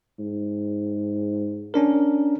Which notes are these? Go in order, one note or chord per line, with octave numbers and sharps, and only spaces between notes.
G#2
C#4 D4 A#4